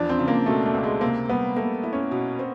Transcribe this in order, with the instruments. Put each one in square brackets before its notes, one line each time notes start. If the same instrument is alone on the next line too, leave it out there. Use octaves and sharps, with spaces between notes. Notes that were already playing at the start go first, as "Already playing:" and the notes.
Already playing: [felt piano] E2 F3 [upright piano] D4
[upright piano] C4
[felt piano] C#3
[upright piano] A#3
[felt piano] B2 [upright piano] A3
[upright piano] A3
[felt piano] C#2
[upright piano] G#3
[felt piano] C3 [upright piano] A#3
[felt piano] G3 [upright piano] B3
[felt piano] A3 [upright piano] A#3
[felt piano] E4
[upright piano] C#4
[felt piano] B2
C4